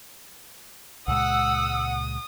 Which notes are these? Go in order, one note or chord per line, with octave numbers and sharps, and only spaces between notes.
C#2 A#2 G#3 F#5 D#6 E6